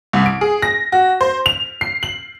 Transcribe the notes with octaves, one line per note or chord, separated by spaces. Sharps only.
C2
D7
G#4
A#6
F#4
C5
F7
C7
F#7